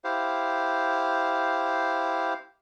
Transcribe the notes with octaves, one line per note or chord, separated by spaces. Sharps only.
E4 G4 C5 F5